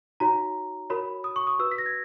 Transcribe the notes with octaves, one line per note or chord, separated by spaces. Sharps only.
D#4 F#4 C#5 A#5
F#4 A#4 C#5 B5
D#6
C#6
D#6
F#4 B4 E6
B6
A#6
G#6